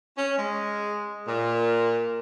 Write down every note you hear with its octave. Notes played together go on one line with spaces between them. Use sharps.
C#4
G#3
A#2